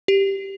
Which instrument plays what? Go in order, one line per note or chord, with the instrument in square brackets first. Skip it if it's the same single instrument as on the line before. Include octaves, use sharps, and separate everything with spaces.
[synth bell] G4